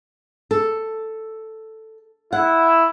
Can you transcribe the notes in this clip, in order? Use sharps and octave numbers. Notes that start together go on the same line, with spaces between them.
A4
E4 F#5